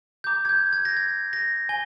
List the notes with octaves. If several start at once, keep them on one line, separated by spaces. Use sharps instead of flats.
A#5 D6 G6
G#6
G6
G#6
A#6
G#6
A#6
G#5 G7